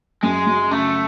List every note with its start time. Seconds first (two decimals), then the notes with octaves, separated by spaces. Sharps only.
0.23 F#2 G#3
0.47 F#3
0.71 C#3 A3